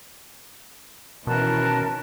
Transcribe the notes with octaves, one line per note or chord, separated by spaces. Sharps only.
B2 D#3 E3 C#4 A#4 A5 F#6